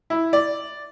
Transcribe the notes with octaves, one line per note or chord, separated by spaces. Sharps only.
E4
D5